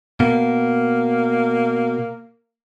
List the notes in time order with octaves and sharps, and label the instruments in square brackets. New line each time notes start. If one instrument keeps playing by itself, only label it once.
[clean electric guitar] B2 [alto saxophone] A#3